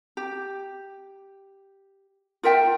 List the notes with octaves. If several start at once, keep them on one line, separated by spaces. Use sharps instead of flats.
G4
F4 A#4 E5 G5